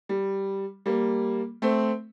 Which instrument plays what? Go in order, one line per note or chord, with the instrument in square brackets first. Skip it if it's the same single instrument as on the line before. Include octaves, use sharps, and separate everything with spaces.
[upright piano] G3
G3 A#3
A3 C4